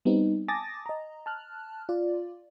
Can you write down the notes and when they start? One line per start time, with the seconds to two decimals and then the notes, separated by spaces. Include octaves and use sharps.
0.05 G3 B3 C4 D#4
0.48 G#5 A5 D6 D#6 A6 A#6
0.86 D#5 A#5
1.26 A5 F6 F#6
1.89 F4 D5